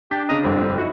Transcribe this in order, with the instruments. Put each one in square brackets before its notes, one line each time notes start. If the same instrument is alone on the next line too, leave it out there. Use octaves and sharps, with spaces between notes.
[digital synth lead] D4 [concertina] G4 [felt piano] G6 B6
[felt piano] C#3 D#5 [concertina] A#5 D#6
[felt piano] G1 C2 F2 [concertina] C4
[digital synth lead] G3
[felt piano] D#4 E4 [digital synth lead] F#4